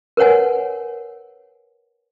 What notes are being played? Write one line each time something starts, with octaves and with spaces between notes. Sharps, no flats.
A#4 B4 C#5 F#5 G#5